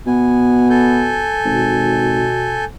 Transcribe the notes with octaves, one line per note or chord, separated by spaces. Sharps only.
B2 B3 G#5
A4 G#5 G6
G#1 B2